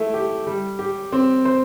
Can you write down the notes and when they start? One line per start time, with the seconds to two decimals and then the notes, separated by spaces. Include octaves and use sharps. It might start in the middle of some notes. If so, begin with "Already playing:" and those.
Already playing: A3 E4
0.14 G4
0.47 G3
0.79 G4
1.12 C4
1.45 C5